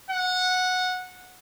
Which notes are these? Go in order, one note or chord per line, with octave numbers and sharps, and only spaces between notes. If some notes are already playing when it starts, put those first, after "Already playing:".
F#5